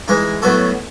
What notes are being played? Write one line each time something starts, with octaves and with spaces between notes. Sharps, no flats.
E3 G#3 D#4
A2 F#3 B3 F#4 A4